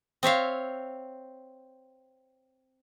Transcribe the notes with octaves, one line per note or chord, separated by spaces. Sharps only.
C4 C#5 E5 F5